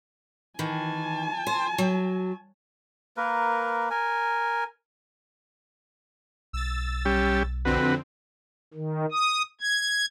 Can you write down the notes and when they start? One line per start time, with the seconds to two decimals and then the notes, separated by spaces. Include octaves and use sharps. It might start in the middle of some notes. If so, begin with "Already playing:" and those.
0.59 D#3 E3 G#5 A5
1.47 C5
1.78 F#3
3.17 A#3 A#4 B4
3.90 A#4 G#5
6.53 B1 E6 A6
7.05 G3 C#4 G4
7.65 F2 D3 C4 F#4 B4
8.74 D#3
9.11 D#6
9.61 G#6